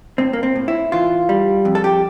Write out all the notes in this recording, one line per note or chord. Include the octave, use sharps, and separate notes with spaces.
A2 C4
A#3
C4
A2
E4
E3 F4
G3
F2
A4
G4